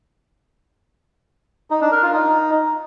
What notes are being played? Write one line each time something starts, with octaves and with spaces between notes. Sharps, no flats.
D#4
D4
A#4
F4
D#4